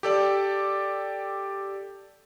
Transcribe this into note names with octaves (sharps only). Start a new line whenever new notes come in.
G4 A4 D5